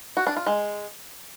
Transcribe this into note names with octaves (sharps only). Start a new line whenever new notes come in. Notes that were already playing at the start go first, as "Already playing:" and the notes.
F#4
D4
F4
G#3